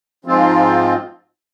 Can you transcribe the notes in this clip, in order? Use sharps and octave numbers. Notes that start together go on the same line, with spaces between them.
G#2 F3 C4 F4